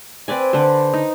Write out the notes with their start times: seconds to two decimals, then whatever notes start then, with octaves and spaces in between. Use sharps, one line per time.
0.28 C4 B4 D5 G#5
0.53 D3 B4 C5
0.93 D#4